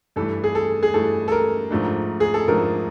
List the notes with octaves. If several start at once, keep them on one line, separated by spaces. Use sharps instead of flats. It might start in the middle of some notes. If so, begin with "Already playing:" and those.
G2 E3 A3 A4
G#4
A4
G#4
G2 E3 A3 A4
A4
A#4
G#2 F3 A3 D4
G#4
A4
G#2 F3 A3 D4 A#4